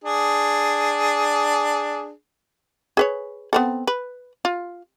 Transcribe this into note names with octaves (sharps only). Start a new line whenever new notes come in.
D4 G#4
G#4 B4 C#5
B3 C4 A4
B4
F4